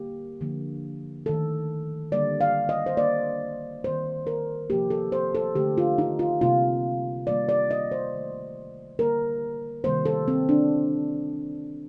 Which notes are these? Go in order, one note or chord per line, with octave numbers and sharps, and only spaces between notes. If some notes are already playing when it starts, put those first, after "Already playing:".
Already playing: D3 G3 A#3 G4
D3 F3 A#3
D#3 A3 A4
D3 G3 A#3 D5
F5
D#5
C5
D#3 A#3 D5
D#3 G3 A#3 C5
A#4
C3 F3 A#3 G4
A4
C5
A4
D3 A3 G4
F4
D#4
F4
C3 G3 A#3 F4
D#3 G3 A#3 D5
D5
D#5
C5
D#3 A3
D3 G3 A#3 A#4
C3 D#3 G3 A#3 C5
A4
C4
D4